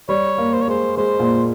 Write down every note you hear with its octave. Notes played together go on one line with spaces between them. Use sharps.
G3 C#5
A#3
C5
C#5
G#3 C5
G#3 C5
A#2